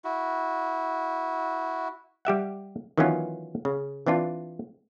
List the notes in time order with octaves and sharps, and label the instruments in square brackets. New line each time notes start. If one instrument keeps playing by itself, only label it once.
[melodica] E4 F#4
[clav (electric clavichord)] G3 G4 E5 F#5
D#3 E3 F#3 B3 C#4 F4
C#3
E3 C4 D4 F4